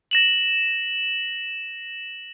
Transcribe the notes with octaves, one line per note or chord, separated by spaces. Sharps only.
A#6 E7 F#7